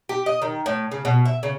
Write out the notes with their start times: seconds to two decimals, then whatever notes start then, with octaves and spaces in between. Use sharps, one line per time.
0.09 G4
0.26 D#5
0.42 D#3
0.66 A2
0.92 C#3
1.05 B2
1.25 E5
1.43 C#3